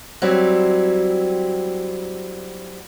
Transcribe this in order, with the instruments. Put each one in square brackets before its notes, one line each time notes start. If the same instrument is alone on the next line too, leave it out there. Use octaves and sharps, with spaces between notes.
[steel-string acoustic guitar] F#3 G3 C4 E4